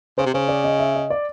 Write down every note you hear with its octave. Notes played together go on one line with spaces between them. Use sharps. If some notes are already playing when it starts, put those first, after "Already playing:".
C#3 C5
C3
C#3 C5
D5
D#5
E5
D#5
D5